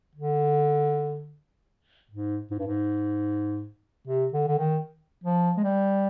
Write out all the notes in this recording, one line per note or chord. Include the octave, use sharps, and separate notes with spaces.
D3
G#2
G#2
G2
G#2
C3
D3
D3
D#3
F3
G#3
G3